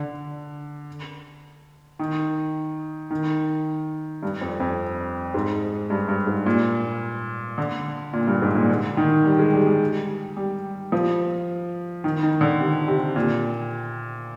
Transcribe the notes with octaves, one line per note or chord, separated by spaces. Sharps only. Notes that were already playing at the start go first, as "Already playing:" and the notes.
Already playing: D3
D#3
D#3
G2
F2
F2
G#2
G2
G2
G#2
A#2
D3
A#2
G2
G#2
A#2
D3
D#3
G3
G#3
G3
G3
G3
F3
D#3
D#3
D3
C3
C3
A#2